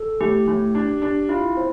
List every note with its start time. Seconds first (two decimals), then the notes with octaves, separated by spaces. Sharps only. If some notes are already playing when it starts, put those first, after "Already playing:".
Already playing: A4
0.20 A2 G4
0.48 A2
0.75 D4
1.02 D4
1.29 E4 F4
1.56 C4